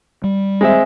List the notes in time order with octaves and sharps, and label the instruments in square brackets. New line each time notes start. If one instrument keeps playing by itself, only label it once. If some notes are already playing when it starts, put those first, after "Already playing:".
[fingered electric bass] G3
[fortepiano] G#3 C4 E5